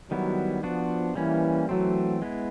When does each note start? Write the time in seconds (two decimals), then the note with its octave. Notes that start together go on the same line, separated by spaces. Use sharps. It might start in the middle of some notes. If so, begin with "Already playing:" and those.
0.11 D#3 F#3 G3 B3 E4
0.63 F3 B3 D4 F#4
1.15 E3 G3 A#3 C#4
1.69 E3 F#3 A3 C4
2.22 G#3 B3 E4